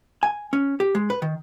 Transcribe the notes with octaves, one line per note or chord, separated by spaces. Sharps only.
G#5
C#4
G4
G#3
B4
D#3